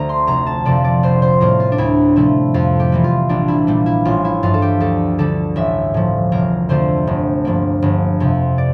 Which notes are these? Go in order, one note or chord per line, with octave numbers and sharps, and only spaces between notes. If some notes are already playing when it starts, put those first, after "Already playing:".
Already playing: D2 D3 A3 C5 A#5
C6
F1 A#5
A5
F2 C3 F3 D5
D5
A#1 C5
C5
A2 G3 A#3 A#4
F4
D4
D2 E4
C3 F3 A3 E4
F2 F4
G4
E3 G3 A#3
F4
A#1 D4
E4
A#2 G3 A#3
E4
A1 F4
E4
G2 F3 A3 F4
A4
G4
D2 A4
D3 G3 A4
A1 E5
A2 F3
F1 A#4
F2 D3 A3 C5
G1
G2 F3 A#3
G1
F2 C3
D5